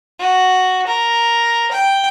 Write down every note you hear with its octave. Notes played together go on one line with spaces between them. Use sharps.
F#4
A#4
G5